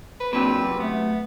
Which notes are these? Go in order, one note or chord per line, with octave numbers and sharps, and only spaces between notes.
B4
A#2 F#3 C4 D4 B4
F#2 C3
A3 B3